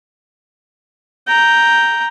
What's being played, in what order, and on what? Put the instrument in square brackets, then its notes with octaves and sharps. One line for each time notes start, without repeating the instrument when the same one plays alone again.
[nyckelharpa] G5 A#5